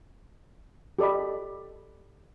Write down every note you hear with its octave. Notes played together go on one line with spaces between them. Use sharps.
G4 A4 D5 D#5 B5